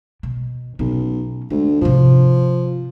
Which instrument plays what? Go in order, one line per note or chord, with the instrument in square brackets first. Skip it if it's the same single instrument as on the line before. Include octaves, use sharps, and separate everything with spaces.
[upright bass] B2
[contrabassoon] B1 [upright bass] B2 C#4
[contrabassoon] D2 [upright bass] G#3
[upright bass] G#2 C3 [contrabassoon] F3